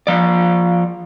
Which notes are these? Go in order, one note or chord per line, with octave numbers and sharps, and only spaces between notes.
F3 D5